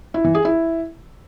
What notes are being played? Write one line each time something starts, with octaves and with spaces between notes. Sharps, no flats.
E4
E3
G#4
E4